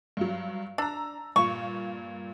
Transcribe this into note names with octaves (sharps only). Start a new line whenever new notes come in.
G2 F#3
D4 A#5 E6
G2 A#2 C#6